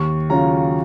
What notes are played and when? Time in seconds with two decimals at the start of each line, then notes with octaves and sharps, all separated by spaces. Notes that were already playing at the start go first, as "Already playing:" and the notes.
Already playing: D#2 C#6
0.30 C#3 F#3 C#4 F4 A#5